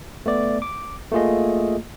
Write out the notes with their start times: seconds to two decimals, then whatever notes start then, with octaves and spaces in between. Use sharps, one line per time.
0.26 A3 B3 D5
0.62 D6
1.12 A3 A#3 F4 G#4 D#5